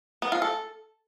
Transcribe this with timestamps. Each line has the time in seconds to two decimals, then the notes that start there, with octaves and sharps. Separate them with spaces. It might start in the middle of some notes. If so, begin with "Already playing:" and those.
0.22 B3
0.32 F4
0.42 A4